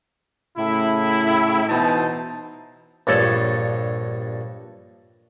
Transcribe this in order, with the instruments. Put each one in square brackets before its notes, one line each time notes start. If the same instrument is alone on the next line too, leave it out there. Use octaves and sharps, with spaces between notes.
[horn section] A2 C#3 A3 E4
B2 E3 B3 D#4 C5 A5
[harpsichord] A#1 G2 A4 C#5 A5